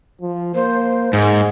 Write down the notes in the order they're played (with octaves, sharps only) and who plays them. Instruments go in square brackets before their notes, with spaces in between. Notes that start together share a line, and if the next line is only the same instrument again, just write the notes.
[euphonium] F3
[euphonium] A#3 [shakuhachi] C5
[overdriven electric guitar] G#2 [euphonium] G#3